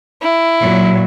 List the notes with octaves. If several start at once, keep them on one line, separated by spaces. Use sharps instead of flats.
E4
A#2 F#3